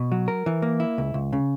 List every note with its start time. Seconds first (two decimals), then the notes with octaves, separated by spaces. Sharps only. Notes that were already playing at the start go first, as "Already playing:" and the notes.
Already playing: B2
0.12 F#3
0.28 A#4
0.46 E3
0.62 A#3
0.80 E4
0.98 C#2
1.14 C#2
1.33 C#3